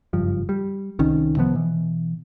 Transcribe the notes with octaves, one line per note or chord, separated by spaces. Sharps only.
F#1 G2 F3
G3
C2 D#3 C#4
C3 D#3 F3 B3
B2 E3